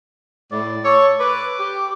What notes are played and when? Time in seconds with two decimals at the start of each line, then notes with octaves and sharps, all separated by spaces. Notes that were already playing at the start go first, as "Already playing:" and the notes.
0.52 A2 D5
0.85 A4 C#5
1.20 B4 D6
1.60 G4